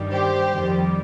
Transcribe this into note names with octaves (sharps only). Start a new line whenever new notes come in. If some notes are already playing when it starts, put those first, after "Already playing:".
Already playing: G2 D#3 G3
G4 C5
F2 D#3 G3